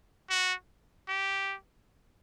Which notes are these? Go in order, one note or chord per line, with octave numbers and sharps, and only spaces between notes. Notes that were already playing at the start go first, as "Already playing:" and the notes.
F#4
G4